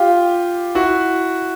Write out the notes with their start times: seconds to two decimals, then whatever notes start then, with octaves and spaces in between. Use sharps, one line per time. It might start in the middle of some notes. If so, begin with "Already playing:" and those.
Already playing: F4 G4
0.75 E4 F#4